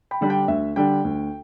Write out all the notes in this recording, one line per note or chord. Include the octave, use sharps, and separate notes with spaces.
G5 B5
D3 G3 D4
G5
D2 E5
D3 G3 D4 G5
D2